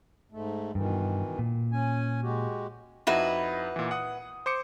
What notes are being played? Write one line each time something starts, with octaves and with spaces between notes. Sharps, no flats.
G#2 A3
G2 B2 D#3 E3
A#2
C#4 G#5
G#3 F#4 G4
F2 D#4 E4 F#4 B4
A#2 E3
F#5 D#6
C5 D6 C#7